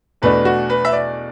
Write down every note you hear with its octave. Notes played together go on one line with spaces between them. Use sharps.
E2 B2 A3 D4 B4
F#4
B4
E5
D5